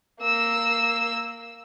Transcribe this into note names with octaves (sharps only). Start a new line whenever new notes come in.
A#3 E6